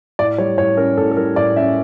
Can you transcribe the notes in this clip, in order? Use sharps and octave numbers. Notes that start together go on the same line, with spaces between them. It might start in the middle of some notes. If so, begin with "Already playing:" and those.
A2 D5
G3 C#5
A2 C#5
C#4 A#4
A2 A4
A4
G3 A#4
A2 D5
C#4 E5